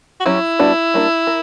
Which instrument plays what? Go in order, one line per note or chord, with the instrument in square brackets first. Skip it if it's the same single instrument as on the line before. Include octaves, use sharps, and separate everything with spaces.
[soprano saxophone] F#4
[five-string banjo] F#3 C#4 G4 [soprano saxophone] E4
[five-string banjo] G3 B3 D4 F#4
G3 A#3 D4
A#4